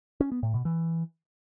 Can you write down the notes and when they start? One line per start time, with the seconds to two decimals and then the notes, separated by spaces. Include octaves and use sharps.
0.20 C#4
0.32 B3
0.43 A2
0.54 B2
0.65 E3